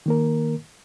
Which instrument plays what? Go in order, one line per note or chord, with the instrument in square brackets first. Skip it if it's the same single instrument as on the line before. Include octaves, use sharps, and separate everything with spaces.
[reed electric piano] D#3 A#3 A#4